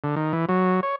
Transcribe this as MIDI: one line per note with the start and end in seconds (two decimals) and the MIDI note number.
0.04 0.15 50
0.16 0.33 51
0.33 0.46 52
0.49 0.80 54
0.83 0.96 73